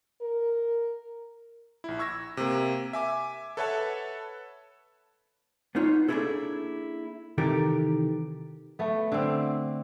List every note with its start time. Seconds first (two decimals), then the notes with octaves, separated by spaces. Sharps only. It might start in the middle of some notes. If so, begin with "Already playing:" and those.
0.21 A#4
1.84 A#1 E4
1.99 C#6 E6 G#6 A#6
2.37 C3 A#3
2.93 E5 G#5 D6
3.57 A4 B4 C#5 E5 F#5 A5
5.75 B3 C#4 D#4 F4 C#5
6.08 A#3 C#4 D4 E4 G#4 A4
7.38 C3 D#3 E3 G4 A4 A#4
8.79 A3 B3
9.12 D3 C4